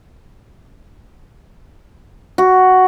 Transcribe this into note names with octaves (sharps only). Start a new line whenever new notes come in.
F#4